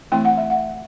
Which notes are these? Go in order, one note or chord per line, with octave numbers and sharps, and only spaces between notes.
E3 A3 C4 E4 G5
F#5
E5
F#5